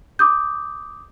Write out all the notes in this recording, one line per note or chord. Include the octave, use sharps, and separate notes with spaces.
D6 D#6 G6